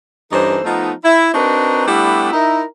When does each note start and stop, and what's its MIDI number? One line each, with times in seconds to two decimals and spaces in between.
0.31 0.59 43
0.31 0.59 52
0.31 0.59 61
0.31 0.59 63
0.31 0.59 69
0.31 0.59 72
0.64 0.92 53
0.64 0.92 57
0.64 0.92 59
0.64 0.92 63
1.04 1.30 64
1.34 1.84 60
1.34 1.84 62
1.34 1.84 63
1.34 1.84 66
1.34 1.84 70
1.34 1.84 71
1.86 2.33 55
1.86 2.33 57
1.86 2.33 59
1.86 2.33 62
1.86 2.33 64
1.86 2.33 67
2.33 2.63 63
2.33 2.63 64
2.33 2.63 70